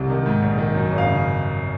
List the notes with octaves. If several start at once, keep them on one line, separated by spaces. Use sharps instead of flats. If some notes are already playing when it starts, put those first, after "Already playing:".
Already playing: C2 C3
D#3
G#2
A#1
D#3
F#2
G#1
F5
C#3